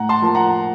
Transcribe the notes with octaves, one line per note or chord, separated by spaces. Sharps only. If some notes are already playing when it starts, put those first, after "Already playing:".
Already playing: A2 F#5 A#5
A5 C6
F3 A#3 A5
F#5 A#5